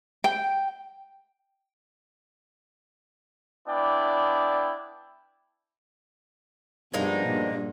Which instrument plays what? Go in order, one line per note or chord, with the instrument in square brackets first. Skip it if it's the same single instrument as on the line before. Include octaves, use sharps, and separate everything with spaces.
[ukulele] G5
[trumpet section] B3 D4 E4 D5 G5
[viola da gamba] G2 [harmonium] F3 B3 D4 [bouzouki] G#3 A#3 D#4
[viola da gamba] G2 A#2